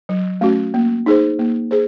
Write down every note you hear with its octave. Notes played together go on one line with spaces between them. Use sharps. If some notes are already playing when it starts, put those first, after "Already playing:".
F#3
A3 C#4 F#4
A#3
D#4 G#4 C5
A#3
G#4 C5